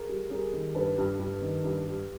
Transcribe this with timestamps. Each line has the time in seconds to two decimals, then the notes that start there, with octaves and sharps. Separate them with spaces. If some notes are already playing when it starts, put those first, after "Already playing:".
Already playing: G#4 A#4
0.09 G3
0.30 G3 G#4 A#4
0.53 D#3
0.75 G2 A4 B4
0.98 G2
1.20 G2
1.41 D#3
1.64 G2
1.87 G3